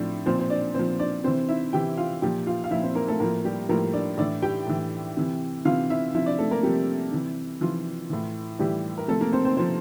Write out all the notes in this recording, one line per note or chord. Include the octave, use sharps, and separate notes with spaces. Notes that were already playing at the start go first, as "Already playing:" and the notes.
Already playing: A2 F3 C4 D4
A#2 F3 C4 C5
C5
D4 D5
A#2 F3 C4 C5
D4 D5
C3 E3 C4 C5
E4 E5
C3 E3 G4 G5
F4 F5
A#2 F3 G4 G5
F4 F5
F5
A#2 F3 E4 E5
C4 C5
A#3 A#4
A3 A4
A2 F3 A#3 A#4
G3 G4
A2 F3 A#3 A#4
D4 D5
A2 E3 D4 D5
G4 G5
A2 E3
C3 E3
C3 E3 F4 F5
E4 E5
C3 F3 E4 E5
D4 D5
A3 A4
A#3 A#4
C3 F3 G3 G4
C3 E3
C3 E3 F3 F4
A2 E3
A2 E3 G3 G4
A#4
C3 F3 A3 A4
A#3 A#4
C4 C5
C4 C5
C3 F3 C4 C5